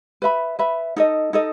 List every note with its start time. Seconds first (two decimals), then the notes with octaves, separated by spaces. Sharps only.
0.22 B4 E5 B5
0.59 B4 E5 B5
0.96 D#4 A4 D#5
1.33 D#4 A4 D#5